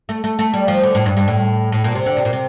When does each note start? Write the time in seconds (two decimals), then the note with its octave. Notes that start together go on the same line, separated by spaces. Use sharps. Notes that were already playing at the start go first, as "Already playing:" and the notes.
0.09 A3
0.24 A3
0.39 A3
0.54 G3
0.68 F3
0.83 D3
0.95 A2
1.06 G2
1.17 G2
1.28 A2
1.72 A2
1.84 A#2
1.95 C3
2.06 D3
2.17 C3
2.25 A#2
2.33 C3